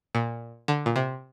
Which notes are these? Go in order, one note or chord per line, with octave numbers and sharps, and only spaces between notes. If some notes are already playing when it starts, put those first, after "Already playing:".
A#2
D3
A#2
C3